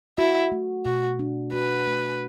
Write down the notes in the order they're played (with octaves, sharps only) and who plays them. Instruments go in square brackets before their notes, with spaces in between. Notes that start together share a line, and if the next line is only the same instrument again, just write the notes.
[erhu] E4 [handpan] F#4
[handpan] A3
[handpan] B2 [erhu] F#4
[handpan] D4
[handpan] F#4 [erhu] B4
[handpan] A3